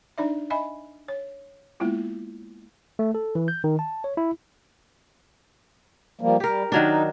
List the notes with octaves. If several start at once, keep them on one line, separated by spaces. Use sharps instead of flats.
D4 D#4 D5 E5
D#5 E5 G#5 B5
C#5
G#3 A#3 B3 E4 F4
A3
A4
E3
G6
D#3
A5
C#5
E4
F3 G3 A#3
G3 G4 A#4
D#3 F#3 D4 D#4